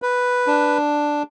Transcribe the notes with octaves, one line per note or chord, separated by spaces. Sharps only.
B4
D4